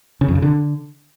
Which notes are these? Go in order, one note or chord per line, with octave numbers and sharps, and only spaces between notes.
C#3
F2
C#3
D3